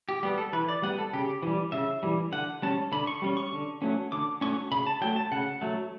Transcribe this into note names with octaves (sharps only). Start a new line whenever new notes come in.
G4
G3 B3 G4
A4
E3 B4
D5
G3 B3 F#5
A4
C#3 G4
E3 G3
C#3 E5
E3 G3
D3 F#5
G3 C#4 A5
D3 B5
C#6
G3 C#4
C#6
D3
F#3 A3 C#4
D3 D6
F#3 A3 C#4 C#6
C#3 B5
A5
F#3 A3 G5
A5
C#3 F#5
F#3 A3